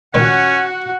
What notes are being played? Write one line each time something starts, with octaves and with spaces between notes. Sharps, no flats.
C#2 A#2 D#3 C#4 F#4 F#5